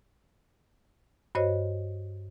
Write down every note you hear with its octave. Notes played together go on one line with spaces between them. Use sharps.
G2 F#4 C5 C#5 D#5